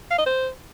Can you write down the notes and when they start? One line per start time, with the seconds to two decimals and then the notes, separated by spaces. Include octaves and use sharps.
0.11 F5
0.18 D#5
0.26 C5